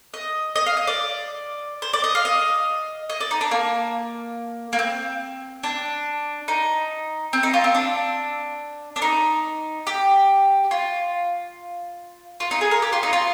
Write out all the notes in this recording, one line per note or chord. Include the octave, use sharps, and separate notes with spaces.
D#5
D#5
F5
D#5
D5
C5
D5
D#5
F5
D#5
D#5
D5
D#4
D4
A#3
A#3
C4
D4
D#4
C4
D#4
F4
C4
D4
D4
D#4
G4
F4
F4
D#4
G#4
A#4
G4
F4
D#4
F4